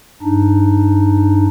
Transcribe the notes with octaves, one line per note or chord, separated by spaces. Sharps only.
G2 D4 D#4